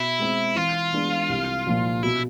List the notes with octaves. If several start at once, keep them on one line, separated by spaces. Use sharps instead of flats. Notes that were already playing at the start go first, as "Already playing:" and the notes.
Already playing: B2 E4
G#3 C4
E3 F4
G#3 B3 D4
C2
A#2 F3
B2 E4